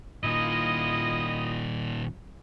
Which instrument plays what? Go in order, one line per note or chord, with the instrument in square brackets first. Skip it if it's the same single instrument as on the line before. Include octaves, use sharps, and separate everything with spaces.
[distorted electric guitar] A#2 D#3 [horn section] E4 F4 D#5